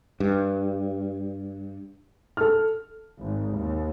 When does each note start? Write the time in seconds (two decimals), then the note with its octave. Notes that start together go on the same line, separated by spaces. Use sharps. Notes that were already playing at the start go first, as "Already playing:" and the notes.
0.20 G2
2.37 A4 F6
3.20 G#1
3.56 D#2